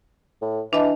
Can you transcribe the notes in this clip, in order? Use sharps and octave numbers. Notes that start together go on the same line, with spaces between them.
A2
E3 D4 D#5 A5